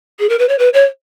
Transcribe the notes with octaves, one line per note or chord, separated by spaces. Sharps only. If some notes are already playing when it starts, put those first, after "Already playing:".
G#4
A#4
B4
C#5
B4
C#5